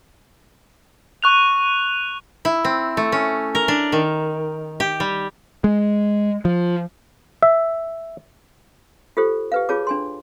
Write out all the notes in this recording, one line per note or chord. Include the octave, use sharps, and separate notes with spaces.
C#6 F#6 F7
E4
C4
A3
C#4
A#4
D4
D#3
G4
G3
G#3
F3
E5
F4 G4 A4 C5
G4 B4 F5
F4 G#4 C#5 A5 D6
D4 G#5 C6